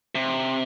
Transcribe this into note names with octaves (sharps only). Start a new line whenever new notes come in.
C3